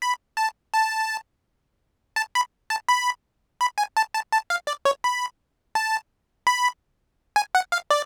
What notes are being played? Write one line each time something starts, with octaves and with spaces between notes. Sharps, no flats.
B5
A5
A5
A5
B5
A5
B5
B5
G#5
A5
A5
A5
F5
D5
C#5
B5
A5
B5
G#5
F#5
F5
D5